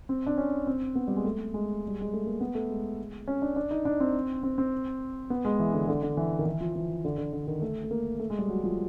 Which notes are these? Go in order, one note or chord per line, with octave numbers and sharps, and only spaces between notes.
C4
D4
C#4
C4
B3
G3
G#3
A3
G#3
G3
G#3
A3
A#3
B3
A3
G#3
C#4
D4
D4
D#4
D4
C4
C4
C4
B3
G#3
E3
D3
D3
D3
E3
D#3
E3
F3
E3
D3
D3
D3
D#3
A3
A3
A#3
A3
G#3
G3
F#3
F3